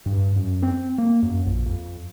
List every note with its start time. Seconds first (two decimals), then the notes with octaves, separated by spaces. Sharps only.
0.06 G2
0.36 F#2
0.62 C4
0.98 A#3
1.23 F#2
1.46 A#1
1.66 F2